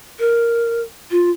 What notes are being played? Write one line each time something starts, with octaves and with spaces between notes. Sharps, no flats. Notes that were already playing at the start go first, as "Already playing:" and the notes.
A#4
F4